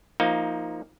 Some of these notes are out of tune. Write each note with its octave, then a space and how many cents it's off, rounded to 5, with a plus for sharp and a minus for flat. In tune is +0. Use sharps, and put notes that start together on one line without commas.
F3 +0 A#3 +0 D#4 +20